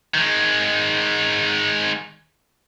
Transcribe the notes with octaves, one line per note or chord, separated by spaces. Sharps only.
D#3 G#3